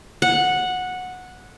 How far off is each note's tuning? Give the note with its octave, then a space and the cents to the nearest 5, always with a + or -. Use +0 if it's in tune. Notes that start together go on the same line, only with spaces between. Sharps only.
F#5 -10